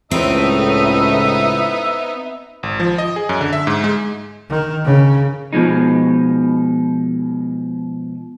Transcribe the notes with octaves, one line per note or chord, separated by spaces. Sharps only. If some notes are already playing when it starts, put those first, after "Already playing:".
C#2 A2 B3 C4 D#4 E5
G#1
F3
D#5
G#4
F#2
D3
E5
G#2
G#3
D#3
C#3
B2 F3 G#3 D#4